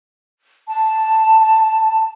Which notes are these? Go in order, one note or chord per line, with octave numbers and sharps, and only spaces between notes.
A5